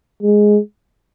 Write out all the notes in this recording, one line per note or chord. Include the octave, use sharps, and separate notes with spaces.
G#3